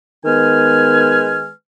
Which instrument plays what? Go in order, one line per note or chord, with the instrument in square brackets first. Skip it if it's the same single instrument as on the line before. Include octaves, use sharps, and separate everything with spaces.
[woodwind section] D#3 G#3 B3 B4 G#5 F6